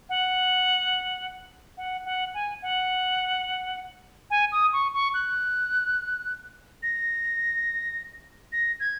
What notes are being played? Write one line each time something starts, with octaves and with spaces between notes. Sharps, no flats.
F#5
F#5
F#5
G#5
F#5
G#5
D#6
C#6
C#6
F#6
A#6
A#6
G#6